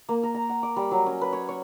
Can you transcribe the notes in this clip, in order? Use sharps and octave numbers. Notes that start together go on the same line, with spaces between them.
A#3
A#4
A#5
F#5
D6
G3
F#3
C#4
B4
C#5
C#5